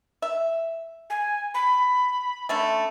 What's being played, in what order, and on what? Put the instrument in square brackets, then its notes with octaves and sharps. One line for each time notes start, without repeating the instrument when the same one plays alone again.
[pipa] E5
[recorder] G#5
B5
[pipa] D3 A3 C#4